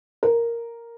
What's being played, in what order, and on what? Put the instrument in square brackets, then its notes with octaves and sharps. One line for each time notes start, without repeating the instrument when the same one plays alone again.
[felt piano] A#4